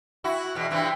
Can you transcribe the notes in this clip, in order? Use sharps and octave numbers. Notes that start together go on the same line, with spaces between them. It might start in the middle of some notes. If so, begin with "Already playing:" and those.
E4 F#4
E2 B2
G2 C3 E3